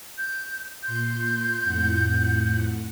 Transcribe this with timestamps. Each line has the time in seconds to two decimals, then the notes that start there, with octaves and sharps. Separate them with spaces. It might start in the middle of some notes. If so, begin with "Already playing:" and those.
0.18 G6
0.83 A#2 C6 G6
1.62 F2 A2 F#5